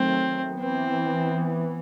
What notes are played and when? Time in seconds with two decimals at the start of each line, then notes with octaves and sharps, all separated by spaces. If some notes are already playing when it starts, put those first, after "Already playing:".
Already playing: D#3 F#3 A3 C4
0.61 E3 B3 C4